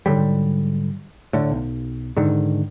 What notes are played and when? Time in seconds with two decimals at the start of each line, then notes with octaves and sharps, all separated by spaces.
0.06 G#2 D3 F#3 G3
1.33 A2 D3
1.52 B1
2.17 G#2 D3 D#3